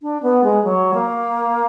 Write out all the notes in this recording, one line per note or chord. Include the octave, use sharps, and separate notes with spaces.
D4
B3
G#3
F#3
A#3